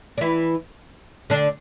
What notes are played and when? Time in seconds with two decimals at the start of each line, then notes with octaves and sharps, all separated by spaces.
0.18 D4
0.21 E3 E4
1.30 D3 D4